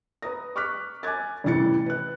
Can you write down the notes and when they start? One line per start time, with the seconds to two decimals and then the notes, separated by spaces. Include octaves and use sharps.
0.22 B4 A#5 D#6 A#6
0.56 C#6 D6 F6 F#6 B6
1.03 G#5 D6 F#6 G#6 A6
1.44 A1 C3 E3 A6 C#7
1.86 B4 F#6